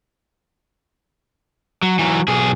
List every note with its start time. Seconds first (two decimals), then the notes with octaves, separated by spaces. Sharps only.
1.83 F#3
1.99 E3 F#3
2.28 B1 G#4